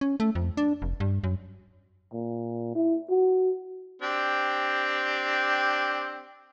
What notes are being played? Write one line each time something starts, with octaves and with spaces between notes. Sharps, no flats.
C#4
A3
F2
D4
F1
G2
F#2
A#2
E4
F#4
C4 D4 G4